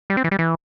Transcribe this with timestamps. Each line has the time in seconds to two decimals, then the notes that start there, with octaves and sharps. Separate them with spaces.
0.10 G3
0.17 C4
0.24 E3
0.31 G3
0.39 E3